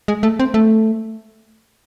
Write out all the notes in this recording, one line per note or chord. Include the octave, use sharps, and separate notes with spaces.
G#3
A3
C4
A3